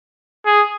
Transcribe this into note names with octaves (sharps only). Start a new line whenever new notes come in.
G#4